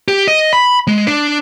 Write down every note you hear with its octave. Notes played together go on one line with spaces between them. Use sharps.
G4
D#5
B5
G#3
D4